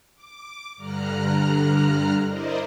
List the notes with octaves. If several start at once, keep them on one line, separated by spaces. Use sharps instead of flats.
D6
G2 D3 A#5 F6 F#6
E4 A#4 C5 D5 D#5